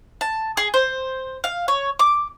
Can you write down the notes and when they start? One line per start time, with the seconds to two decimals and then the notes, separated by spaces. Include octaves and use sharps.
0.21 A5
0.57 G#4
0.74 C5
1.44 F5
1.68 C#5
1.99 D6